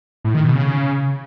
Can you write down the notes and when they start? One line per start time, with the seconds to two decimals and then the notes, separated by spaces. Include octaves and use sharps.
0.25 A2
0.34 D#3
0.44 B2
0.54 C#3